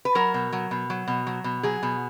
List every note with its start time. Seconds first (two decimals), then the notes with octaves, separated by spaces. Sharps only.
0.05 B4
0.15 F#3 A#4
0.34 B2
0.53 F#3
0.71 B2
0.90 F#3
1.08 B2
1.27 F#3
1.44 B2
1.63 F#3 G#4
1.83 B2